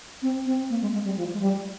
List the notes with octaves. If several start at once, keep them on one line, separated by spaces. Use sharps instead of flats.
C4
C4
A#3
G#3
G#3
G3
F3
G#3
G3